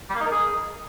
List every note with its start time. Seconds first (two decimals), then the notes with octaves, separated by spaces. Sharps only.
0.10 G3
0.15 A#3
0.21 D#4
0.26 A#4
0.31 G#4